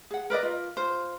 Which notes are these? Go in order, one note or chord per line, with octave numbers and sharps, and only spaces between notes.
G#4 F#5
A#4 B4 D5 D#5
F4
F4 C5